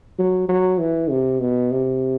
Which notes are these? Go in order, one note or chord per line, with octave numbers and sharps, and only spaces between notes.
F#3
F#3
E3
C3
B2
C3